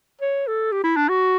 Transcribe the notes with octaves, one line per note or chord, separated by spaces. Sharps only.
C#5
A4
G4
E4
D4
F#4